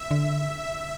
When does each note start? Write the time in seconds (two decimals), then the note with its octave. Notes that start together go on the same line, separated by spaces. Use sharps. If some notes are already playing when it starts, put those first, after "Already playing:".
Already playing: E5
0.11 D3